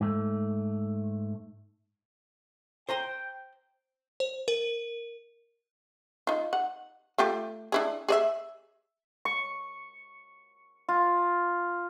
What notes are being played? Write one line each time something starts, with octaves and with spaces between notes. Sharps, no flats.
G#2 A3
C5 G5 A#5 C6
C5
A#4
D#4 F4
F#5
A3 F4 G4
D4 E4 G#4
G#4 D5 E5
C#6
F4